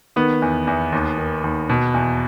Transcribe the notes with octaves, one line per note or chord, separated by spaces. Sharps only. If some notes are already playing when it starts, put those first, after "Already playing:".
D#3 B3
E2
E2
D#2
D#3
D#2
B2
E2